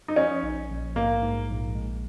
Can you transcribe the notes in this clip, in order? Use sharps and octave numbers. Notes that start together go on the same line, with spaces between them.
D#4
F3 C#4
A#1
A#1
G#2 A#3
G#2
A#1
G#3